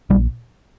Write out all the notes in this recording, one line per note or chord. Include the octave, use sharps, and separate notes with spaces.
A#1 G3